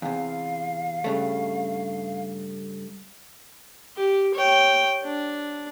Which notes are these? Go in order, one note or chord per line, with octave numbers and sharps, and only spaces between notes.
E2 C3 F5
G2 C#3 A3
G4
C#5 G5
D4